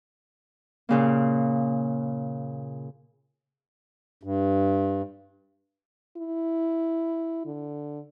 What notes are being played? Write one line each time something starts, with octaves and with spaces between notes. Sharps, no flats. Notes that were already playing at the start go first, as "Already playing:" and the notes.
A#2 C#3 A#3
G2
E4
D3